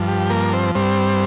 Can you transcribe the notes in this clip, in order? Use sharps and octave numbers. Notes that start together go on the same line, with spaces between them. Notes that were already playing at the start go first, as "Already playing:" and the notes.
Already playing: G2 F3
G4
A#3 A#4
C4 C5
G2 G3 C4 C5